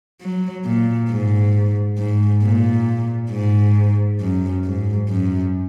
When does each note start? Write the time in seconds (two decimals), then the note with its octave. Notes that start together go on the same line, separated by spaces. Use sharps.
0.21 F#3
0.65 A#2
1.10 G#2
1.98 G#2
2.43 A#2
3.31 G#2
4.20 F#2
4.64 G#2
5.08 F#2